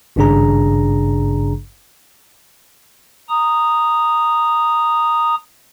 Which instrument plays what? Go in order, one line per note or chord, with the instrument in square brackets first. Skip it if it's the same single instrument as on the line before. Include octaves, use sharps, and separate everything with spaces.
[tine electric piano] G#1 G2 C#3 D4 G#4 A#5
[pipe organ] A#5 D#6